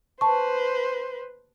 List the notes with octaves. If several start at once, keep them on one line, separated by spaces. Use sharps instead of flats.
B4 C5 A5 C#6